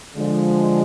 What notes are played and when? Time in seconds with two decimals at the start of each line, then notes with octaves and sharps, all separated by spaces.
0.15 D3 F3 G#3